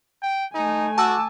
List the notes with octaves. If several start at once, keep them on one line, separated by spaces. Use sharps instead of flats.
G5
A3 D#4 G#5
F#4 A5 D6 E6